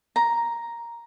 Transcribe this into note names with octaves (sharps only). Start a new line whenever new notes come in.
A#5